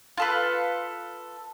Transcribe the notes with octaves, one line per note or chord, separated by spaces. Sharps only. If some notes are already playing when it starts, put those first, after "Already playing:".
F4 A4 B4